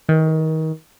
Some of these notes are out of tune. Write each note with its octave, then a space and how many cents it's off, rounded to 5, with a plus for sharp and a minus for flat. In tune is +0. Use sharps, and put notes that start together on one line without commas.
D#3 +30